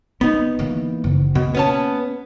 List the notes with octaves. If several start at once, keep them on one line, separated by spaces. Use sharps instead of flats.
B3 C4 D#4
E3 A#3
F#1
B2 A#3
B3 C#4 A5